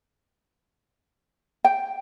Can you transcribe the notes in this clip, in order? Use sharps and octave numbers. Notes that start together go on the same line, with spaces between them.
G5